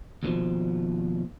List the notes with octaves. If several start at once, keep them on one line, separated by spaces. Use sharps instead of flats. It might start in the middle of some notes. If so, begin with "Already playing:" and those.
D#2 B2 D#3 F3